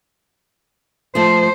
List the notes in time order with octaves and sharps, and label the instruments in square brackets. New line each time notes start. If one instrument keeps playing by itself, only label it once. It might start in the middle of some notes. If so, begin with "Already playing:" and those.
[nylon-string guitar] F3 A3 [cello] C5